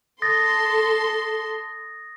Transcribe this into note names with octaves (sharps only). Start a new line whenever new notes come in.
A4 C6 D#6 A6 A#6